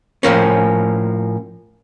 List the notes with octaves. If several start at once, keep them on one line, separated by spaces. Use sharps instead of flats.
A2 F3 A#3 C#4